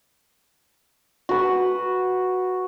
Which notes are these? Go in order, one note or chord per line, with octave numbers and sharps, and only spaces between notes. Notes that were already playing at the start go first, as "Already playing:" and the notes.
F#4 B4